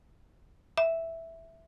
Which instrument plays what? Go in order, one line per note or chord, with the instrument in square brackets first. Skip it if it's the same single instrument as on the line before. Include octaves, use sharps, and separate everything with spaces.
[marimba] E5